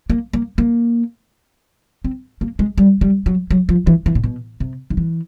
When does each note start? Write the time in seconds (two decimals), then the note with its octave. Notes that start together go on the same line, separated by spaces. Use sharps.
0.10 A#3
0.33 A#3
0.58 A#3
2.04 C4
2.41 A#3
2.59 G#3
2.78 G3
3.01 G3
3.26 F#3
3.51 F#3
3.69 F3
3.87 E3
4.06 E3
4.15 A#2
4.24 B2
4.60 C3
4.90 D#3
4.97 E3